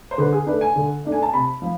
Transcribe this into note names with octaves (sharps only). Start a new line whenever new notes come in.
C5
D3 B4
G#4
A3 D4 B4
G#5
D3
A3 D4
G#5
A5
C3 B5
F3